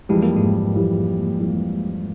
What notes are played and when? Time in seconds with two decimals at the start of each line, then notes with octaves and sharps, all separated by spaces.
0.09 F2 E3 G3 G#3
0.22 A#3
0.36 G#2 G#3
0.74 F2 E3 G3
1.40 F2 E3 G3